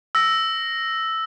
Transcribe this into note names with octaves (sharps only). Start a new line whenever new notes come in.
E6 A#6